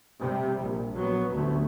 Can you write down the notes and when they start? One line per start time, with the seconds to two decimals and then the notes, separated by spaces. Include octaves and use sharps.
0.20 C3 G3
0.61 A#1
0.94 A#1 F#3 B3
1.32 A1 D2 A3